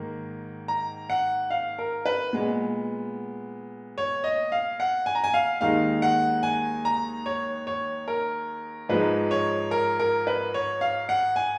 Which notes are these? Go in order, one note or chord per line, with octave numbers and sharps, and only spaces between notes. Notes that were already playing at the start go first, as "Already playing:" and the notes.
Already playing: G#2 D#3 A#3
A#5
F#5
F5
A#4
B4
A#2 G#3 B3
C#5
D#5
F5
F#5
G#5
A#5
G#5
F5
D#2 D#3 G#3 D#4 F5
F#5
G#5
A#5
C#5
C#5
A#4
G#2 F3 G#3 D#4 B4
C#5
A#4
A#4
B4
C#5
F5
F#5
G#5